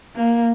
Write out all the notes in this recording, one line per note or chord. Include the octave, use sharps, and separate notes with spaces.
A#3